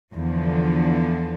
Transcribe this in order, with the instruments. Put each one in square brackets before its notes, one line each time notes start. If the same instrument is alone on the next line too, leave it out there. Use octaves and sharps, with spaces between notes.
[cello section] E2 D3 F3